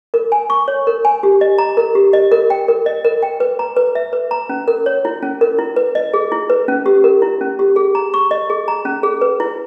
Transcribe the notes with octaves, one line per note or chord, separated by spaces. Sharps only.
A#4
G#5
C#6
C#5
A#4
G#5
G4
D#5
A#5
A#4
G4
D#5
A#4
G5
A#4
D#5
A#4
G5
B4
A#5
B4
E5
B4
A#5
C#4
A#4
C#5
E4
C#4
A#4
E4
B4
D#5
G#4
E4
B4
C#4
G4
A#4
E4
C#4
G4
G#4
A#5
C#6
D#5
G#4
A#5
C#4
G#4
B4
E4